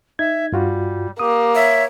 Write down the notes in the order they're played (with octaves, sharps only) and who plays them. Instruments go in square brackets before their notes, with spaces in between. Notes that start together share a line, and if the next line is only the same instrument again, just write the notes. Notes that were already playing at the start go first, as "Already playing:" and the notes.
[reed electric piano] D#4 G#6 [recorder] E5
[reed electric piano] G2 F4 F#4 [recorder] G3
[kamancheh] A#3 [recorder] G4 [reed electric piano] D#6
[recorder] C#5 [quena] E5